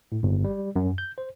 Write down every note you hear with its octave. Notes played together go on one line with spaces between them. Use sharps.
A2
G1
G3
F#2
G6
C5